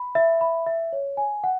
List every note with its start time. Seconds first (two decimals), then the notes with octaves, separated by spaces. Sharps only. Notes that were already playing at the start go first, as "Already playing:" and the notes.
Already playing: B5
0.15 E5
0.41 B5
0.66 E5
0.93 C#5
1.17 G#5
1.44 F#5